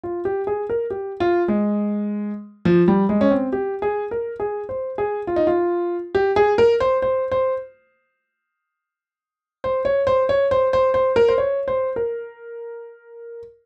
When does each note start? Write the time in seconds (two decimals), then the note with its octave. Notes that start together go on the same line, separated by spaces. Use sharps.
0.04 F4
0.25 G4
0.47 G#4
0.69 A#4
0.90 G4
1.20 F4
1.48 G#3
2.65 F3
2.88 G3
3.09 G#3
3.21 C#4
3.31 C4
3.53 G4
3.82 G#4
4.11 A#4
4.40 G#4
4.69 C5
4.98 G#4
5.27 F4
5.36 D#4
5.47 F4
6.15 G4
6.36 G#4
6.58 A#4
6.80 C5
7.02 C5
7.32 C5
9.64 C5
9.85 C#5
10.07 C5
10.29 C#5
10.51 C5
10.73 C5
10.94 C5
11.16 A#4
11.28 C5
11.38 C#5
11.68 C5
11.96 A#4